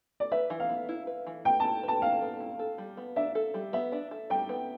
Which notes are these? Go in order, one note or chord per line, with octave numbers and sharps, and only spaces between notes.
D5
B4 E5
E3
F5
B3
E4
B4
E3
B3 G5
E4 A5
B4 A5
E3 F5
B3
E4
A4
G3
B3
D4 E5
A4
G3
B3 E5
D4
A4
G3 G5
B3